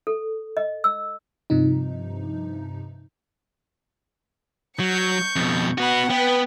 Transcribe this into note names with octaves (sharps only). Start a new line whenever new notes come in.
A4
D#5
E6
G2 C3 F3 D#4
F#3 C#6 G6
F2 B2
B3 F#4 F#5 B5
B3 B4 G5